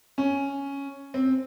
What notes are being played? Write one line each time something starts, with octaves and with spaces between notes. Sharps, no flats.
C#4
C4